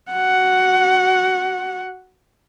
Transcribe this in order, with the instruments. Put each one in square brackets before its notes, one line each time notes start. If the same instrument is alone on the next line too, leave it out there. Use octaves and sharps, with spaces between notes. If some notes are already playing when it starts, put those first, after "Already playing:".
[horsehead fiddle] F#4 F#5